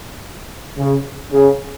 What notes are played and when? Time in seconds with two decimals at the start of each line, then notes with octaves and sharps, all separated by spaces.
0.78 C#3
1.33 C#3